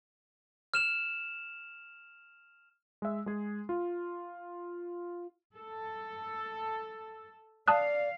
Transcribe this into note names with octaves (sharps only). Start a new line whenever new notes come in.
F6 E7 F7
G#3 E5
G#3 G#4
F4
A4
D5 F5 A5 D#6 F#6